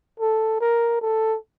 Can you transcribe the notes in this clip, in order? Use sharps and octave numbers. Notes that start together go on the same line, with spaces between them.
A4
A#4
A4